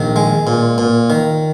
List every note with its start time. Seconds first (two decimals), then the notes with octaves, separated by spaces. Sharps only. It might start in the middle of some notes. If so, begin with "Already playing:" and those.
Already playing: A#1 D#3
0.16 G#3
0.47 A#2
0.78 A#2
1.10 D#3